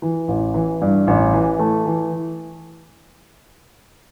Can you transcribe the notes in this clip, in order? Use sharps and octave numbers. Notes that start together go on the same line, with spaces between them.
E3
A1
E3
G2
A1
E3
A3
E3